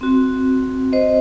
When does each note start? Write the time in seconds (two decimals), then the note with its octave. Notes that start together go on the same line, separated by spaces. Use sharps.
0.01 C4 F#4
0.93 C5 D#5